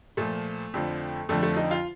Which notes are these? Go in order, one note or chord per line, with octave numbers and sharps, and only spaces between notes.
A#2 F3 A3
F2 D3 F3
F2 D3 F3 A3
A3
D#4
F4